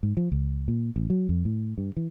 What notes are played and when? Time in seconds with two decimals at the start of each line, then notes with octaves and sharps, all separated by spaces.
0.03 G#2
0.17 F3
0.32 C#2
0.68 A#2
0.96 A1
1.10 F#3
1.29 F2
1.45 A2
1.78 G2
1.97 E3